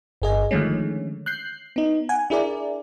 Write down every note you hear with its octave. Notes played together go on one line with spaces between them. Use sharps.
G1 G#4 D#5 G#5
D3 D#3 F3 G#3 A3 C#4
F#6 G6 C7
B3 D#4
F#5 G#5
D4 E4 G#4 A#4 D5